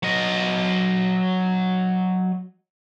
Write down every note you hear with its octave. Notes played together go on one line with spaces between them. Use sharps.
F#3 D#5